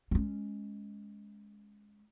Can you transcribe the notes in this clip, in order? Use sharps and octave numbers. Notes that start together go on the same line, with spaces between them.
G#3 C#4